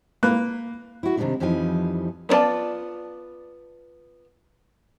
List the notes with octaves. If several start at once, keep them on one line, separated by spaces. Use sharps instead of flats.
A#3 B4 F#6
E4 F#4
C3 D#3 F3 G3 A3 D4
F2 E3 F3 G3 D#4 G#5
B3 D4 F4 D5 A5